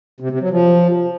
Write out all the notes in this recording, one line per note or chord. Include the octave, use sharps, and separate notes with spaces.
C3
C3
F#3
F3